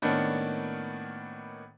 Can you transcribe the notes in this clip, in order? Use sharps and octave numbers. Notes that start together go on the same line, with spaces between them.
A2 D#3 A#3 B3 C#4 D4